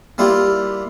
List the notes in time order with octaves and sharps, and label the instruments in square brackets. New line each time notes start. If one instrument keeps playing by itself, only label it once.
[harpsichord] G3 A#3 E4 F4 G4